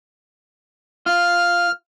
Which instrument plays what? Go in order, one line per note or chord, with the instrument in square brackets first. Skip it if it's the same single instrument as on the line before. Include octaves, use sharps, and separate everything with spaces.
[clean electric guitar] F4 [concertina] F6